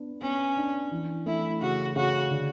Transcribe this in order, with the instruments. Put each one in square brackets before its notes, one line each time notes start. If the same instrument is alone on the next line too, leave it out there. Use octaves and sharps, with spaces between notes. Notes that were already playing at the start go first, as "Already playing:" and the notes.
Already playing: [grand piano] B3 D4
[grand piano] B3 [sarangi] C#4
[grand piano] D4
E3
[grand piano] A3 [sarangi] E4
[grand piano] C#3 [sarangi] F#4
[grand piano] C#3 [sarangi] F#4
[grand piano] D3